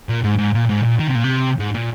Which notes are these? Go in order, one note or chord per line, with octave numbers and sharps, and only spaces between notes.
A#2
G#2
G#2
A#2
G#2
A#2
D#3
C3
A#2
C3
G#2
A#2